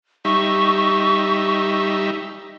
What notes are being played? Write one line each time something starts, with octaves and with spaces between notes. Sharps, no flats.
G3 D#4 E5 C#6